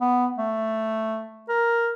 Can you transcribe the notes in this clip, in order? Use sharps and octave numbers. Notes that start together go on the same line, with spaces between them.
B3
A3
A#4